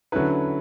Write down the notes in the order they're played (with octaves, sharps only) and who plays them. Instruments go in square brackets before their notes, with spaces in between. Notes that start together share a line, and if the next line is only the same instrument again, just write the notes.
[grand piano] D3 F#3 C#4 E4 B4